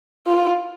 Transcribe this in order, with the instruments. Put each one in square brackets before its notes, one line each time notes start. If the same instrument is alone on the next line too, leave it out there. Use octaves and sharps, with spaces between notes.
[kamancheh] F4